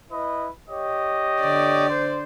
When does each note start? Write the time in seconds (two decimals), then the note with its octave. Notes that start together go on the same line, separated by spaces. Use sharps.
0.11 E4 B4 D#5
0.69 G4 C#5 D#5
1.40 D3 D5
1.90 C5